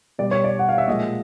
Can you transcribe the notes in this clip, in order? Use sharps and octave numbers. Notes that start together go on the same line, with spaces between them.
B2 G3 D5
C#5
D5
F#5
F5
E5
A#2 F3 G#3 D#5